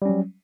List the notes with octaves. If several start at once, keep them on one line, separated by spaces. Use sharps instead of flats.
F#3 G3 C#4